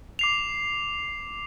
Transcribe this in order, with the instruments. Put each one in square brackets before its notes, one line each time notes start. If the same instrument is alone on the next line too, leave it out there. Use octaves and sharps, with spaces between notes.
[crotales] D6 C7 F7